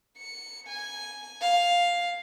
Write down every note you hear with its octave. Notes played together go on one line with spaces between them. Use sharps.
C#7
G#5
F5